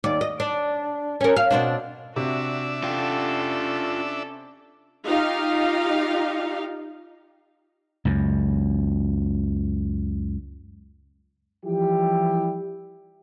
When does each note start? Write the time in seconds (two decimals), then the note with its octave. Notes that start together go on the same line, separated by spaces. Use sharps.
0.04 D#2 D5
0.21 D#5
0.40 D4
1.21 C#4 A#4
1.36 F5
1.51 B2 C4 D4
2.16 C3 D4 F#4 E5
2.84 C#4 F4 G4 A4
5.06 D#4 F4 G4 F5
8.05 C#2 F#2
11.65 E3 F3 G3 E4 G4